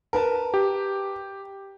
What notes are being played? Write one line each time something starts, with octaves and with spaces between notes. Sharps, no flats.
A#4 B4 A5
G4